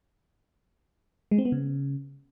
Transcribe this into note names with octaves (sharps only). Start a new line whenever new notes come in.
G#3
C4
B3
C#3